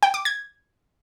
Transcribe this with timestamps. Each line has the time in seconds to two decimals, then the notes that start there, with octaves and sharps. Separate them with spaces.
0.03 G5
0.14 D6
0.25 G#6